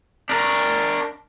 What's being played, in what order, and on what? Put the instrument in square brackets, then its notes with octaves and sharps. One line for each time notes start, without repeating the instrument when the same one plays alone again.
[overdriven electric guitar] D4 A#4